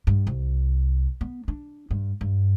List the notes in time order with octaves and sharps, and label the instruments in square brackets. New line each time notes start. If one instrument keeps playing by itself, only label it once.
[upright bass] G2
C2
B3
D4
G2
G2